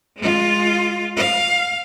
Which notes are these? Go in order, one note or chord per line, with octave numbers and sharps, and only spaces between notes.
G#3 F4
F5